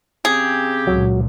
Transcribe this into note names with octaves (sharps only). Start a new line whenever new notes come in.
C#3 C4 G4 G#4
C#2 A#2 F#3